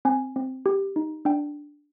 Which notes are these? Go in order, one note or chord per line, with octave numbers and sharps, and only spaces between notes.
C4 G#5
C4
G4
D#4
D4 G5